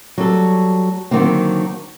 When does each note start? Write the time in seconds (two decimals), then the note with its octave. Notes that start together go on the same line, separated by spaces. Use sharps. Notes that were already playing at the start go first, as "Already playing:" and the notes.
0.18 F#3 G3 A4
1.11 D3 D#3 F#3 A#3 C4